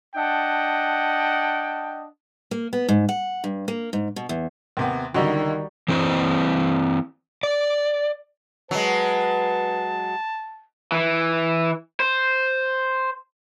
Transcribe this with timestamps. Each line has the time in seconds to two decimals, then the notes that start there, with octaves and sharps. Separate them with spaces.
0.15 D4 D#5 F#5 G5 A5
2.51 A#3
2.73 B3
2.89 G#2
3.09 F#5
3.44 G2
3.68 A#3
3.93 G#2
4.16 B2
4.29 E2
4.77 D#2 C3 B3
5.15 C#2 D3 D#3 G3 D#4 F#4
5.88 E3 C4 E4 C5
7.43 D5
8.71 F#3 G#3 B4 A5
10.92 E3
12.00 C5